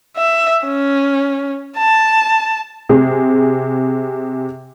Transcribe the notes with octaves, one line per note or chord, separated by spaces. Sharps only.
E5
C#4
A5
C3 G#4